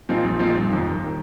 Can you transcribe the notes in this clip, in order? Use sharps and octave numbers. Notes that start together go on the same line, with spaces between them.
A#2 F3 C4 D#4
A#1
A#2 F3 C4 D#4
G1
F2 D#3
G1
D#3